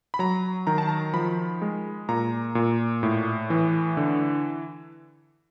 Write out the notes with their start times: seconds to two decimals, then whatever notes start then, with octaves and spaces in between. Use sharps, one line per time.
0.14 B5
0.19 F#3 A#5
0.67 D#3 A#5
0.78 A5
0.89 A#5
1.14 F3 B5
1.62 G#3
2.09 A#2 A#5
2.55 A#2
3.03 A2
3.50 E3
3.97 D3